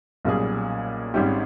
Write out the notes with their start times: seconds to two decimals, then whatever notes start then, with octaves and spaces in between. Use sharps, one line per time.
0.25 B1 A#2 G3 C#4 G#4
1.14 G#1 G#2 G3 C#4 G4